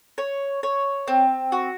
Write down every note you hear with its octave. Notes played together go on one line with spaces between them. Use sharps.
C#5
C#5
C4
F#4